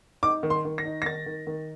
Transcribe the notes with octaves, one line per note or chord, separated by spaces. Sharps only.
D#4 D6
D#3
C6
D#3
A#6
D#4
A#6
D#3 A6
D#3
D#3